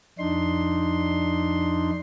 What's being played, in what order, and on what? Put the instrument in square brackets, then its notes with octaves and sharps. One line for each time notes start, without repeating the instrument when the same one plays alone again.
[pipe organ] F2 D4 D#4 C6